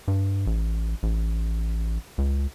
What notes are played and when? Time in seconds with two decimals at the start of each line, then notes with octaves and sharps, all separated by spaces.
0.08 G2
0.47 A1
1.03 A1
2.18 C#2